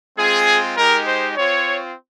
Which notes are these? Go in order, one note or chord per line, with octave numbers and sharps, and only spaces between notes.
G#3 C4 F4 G#4
G#3 D#4 G4 A#4
C5
C4 F4 C#5